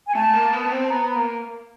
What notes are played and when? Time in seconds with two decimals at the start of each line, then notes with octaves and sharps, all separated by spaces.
0.06 G#5
0.15 A3 A5
0.34 A#3
0.53 B3
0.72 C4
0.83 A5
0.90 B3 A#5
1.09 A#5
1.15 A#3